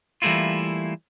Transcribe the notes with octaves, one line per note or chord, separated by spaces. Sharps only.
E3 G3 A3 A#3 E4 F4